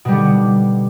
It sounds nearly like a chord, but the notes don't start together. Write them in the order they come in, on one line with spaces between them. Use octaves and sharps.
B2 G3 D3